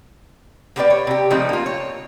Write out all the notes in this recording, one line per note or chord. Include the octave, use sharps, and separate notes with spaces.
A#3 B3 G4 B4 C5 D5
C#5
C3 G4
C#3 F3 G3 A3 C4 D#4
A#3 F4
C#5